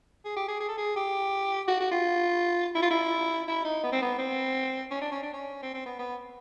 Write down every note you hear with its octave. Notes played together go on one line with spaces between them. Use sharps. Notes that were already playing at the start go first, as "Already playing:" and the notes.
G#4
G4
G#4
G#4
A4
G#4
G4
F#4
F#4
F4
E4
F4
E4
E4
D#4
B3
C4
B3
C4
C#4
D4
C#4
D4
C#4
C4
C4
B3
B3